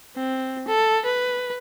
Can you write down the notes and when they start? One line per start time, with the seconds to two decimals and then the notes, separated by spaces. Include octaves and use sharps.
0.16 C4
0.68 A4
1.05 B4